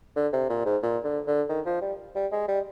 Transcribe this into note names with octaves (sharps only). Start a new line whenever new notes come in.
D3
C3
A#2
G#2
A#2
D3
D3
D#3
F3
G3
G3
G#3
G3